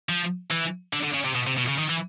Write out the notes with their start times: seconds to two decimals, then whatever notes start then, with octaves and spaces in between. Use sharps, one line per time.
0.09 F3
0.51 E3
0.93 D3
1.04 D3
1.14 C#3
1.25 C3
1.35 B2
1.47 C3
1.58 B2
1.68 C#3
1.78 D#3
1.89 E3